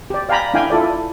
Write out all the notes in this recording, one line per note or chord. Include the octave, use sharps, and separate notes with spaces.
G4 D5
D5 F5 G5 G#5 A#5 B5
D4 E4 F5 G5 G#5
E4 F4 A4 D5